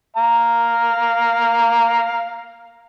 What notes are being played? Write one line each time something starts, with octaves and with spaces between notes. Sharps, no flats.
F5 A#5